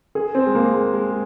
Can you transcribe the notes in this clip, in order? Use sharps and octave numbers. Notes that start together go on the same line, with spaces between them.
G#4
C4
G#3
A#3
G#3
G#3